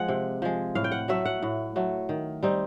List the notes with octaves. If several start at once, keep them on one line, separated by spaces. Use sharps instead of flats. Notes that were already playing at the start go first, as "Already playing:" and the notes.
Already playing: F3 G#3 F#5
C3
F3 G#3
A2 F5
G5
F#5
F#3 A3 E5
F#5
A2
F#3 A3
D#3
G3 C4 D#4